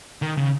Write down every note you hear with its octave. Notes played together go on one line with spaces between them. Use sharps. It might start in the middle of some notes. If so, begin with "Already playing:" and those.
D#3
C#3